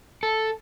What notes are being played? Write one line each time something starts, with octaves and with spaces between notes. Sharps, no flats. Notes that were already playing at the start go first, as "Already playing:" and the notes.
A4